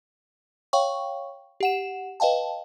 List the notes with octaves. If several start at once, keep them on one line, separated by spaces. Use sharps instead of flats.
C#5 F5 G5 C#6
G4 F#5 E7
B4 D#5 F5 G5 A5